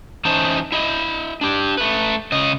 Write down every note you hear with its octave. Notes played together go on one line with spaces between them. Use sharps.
E3 C#4 D#4 C5 A5
E4 D#5
D4 G4
A3 B4
C#3 D#5